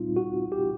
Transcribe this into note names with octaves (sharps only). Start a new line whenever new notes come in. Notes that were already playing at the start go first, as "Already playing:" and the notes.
Already playing: A#2 G3 C4 D#4 F4
F#4
G4